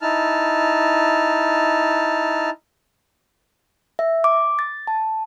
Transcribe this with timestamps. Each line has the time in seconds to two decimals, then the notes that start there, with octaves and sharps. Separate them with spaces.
0.02 D#4 E4 A5 F6
3.99 E5
4.24 D6
4.59 A6
4.87 A5